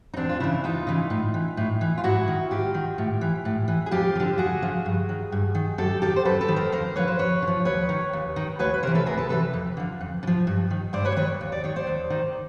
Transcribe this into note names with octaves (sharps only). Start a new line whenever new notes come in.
D#4
E2 C4 D4
F4
C#3 E3 D4 E4
E2 D#4 F4
C#3 E3
A2
E3
A2
E3
F4
G#2 E4 F#4
D#3
G#2 F4 G4
D#3
A2
E3
A2
E3
G#4
F2 F4 G4
F3
D3
F2 F#4 G#4
D3 F3
G2
D#3
G2
D#3
F#2 G4 A4
D#3 G4 A4
C5
F#2 A4 B4
A4 B4
D#3
A#4 C5
F2 A#4 C5
D3 F3 B4 C#5
C5
F2 B4 C#5
D3
F3
D#2 B4 C#5
D#3
D#2
D#3
D2 B4 C#5
B4
C3 E3 A#4 C5
A4 B4
D2 G#4 A#4
A4 B4
C3 E3 A4 B4
F2
D3 F3
F2
D3
F3
G2
D#3
G2 C5 D5
B4 C#5
C5
D#3 B4 C#5
D#2
D5
D#3 C#5
C5 D5
D#2
D#3